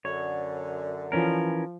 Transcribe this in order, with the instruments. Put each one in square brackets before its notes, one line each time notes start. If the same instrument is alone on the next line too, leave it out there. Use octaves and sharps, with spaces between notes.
[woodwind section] F#2 D3 [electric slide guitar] C#5
[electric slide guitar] E3 C#4 A#4 [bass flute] F3